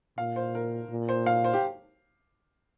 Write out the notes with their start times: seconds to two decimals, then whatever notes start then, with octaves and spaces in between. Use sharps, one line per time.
0.18 A#2 F5
0.36 C5
0.55 A#4
0.90 A#2
1.09 C5
1.26 F5
1.44 C5
1.54 G4